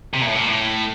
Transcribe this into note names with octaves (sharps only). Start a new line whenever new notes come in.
C3
A#2
A2
A#2
A2